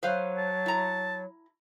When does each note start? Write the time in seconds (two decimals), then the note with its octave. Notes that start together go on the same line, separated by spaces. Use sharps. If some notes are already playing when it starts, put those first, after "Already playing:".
0.03 F#3 B4 C5 F5
0.38 A5
0.66 E4 A#5